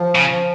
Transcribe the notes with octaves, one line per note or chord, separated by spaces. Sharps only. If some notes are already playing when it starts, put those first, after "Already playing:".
Already playing: F3
C#3
F3